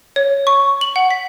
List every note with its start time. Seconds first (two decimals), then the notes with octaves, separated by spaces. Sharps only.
0.16 C#5
0.47 C#6
0.81 F#7
0.96 F#5
1.11 B6